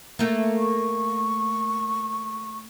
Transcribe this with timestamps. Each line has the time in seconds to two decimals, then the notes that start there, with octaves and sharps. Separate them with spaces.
0.19 A3 A#3
0.59 C#6